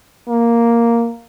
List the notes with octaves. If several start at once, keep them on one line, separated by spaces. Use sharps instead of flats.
A#3